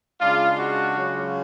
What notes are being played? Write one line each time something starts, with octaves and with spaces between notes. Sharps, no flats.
C#3 G#3 D4 F4
F#4
C#3 F#3 C#4 F4